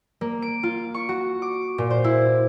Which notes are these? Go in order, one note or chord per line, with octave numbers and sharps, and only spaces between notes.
A#3
D7
F4
C#6
F#4
D6
A#2
C5
E4